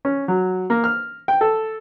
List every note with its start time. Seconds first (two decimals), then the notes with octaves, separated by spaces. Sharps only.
0.05 C#4
0.28 F#3
0.70 A#3
0.84 F6
1.28 G5
1.41 A4